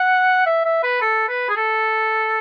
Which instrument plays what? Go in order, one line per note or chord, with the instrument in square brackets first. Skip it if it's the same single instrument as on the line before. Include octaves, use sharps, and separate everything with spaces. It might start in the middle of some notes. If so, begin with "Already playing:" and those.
Already playing: [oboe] F#5
E5
E5
B4
A4
B4
G#4
A4